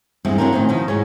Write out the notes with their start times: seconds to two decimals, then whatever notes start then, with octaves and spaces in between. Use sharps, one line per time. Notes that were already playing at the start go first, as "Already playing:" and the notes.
0.25 E2 G2 G#3 C4
0.38 F#3 G3 A#3 C4 D4 A#4
0.52 A2 D#3 E3 C4 C#4 D#4
0.69 B2 D#3 F3
0.88 G#2 G#4 C#5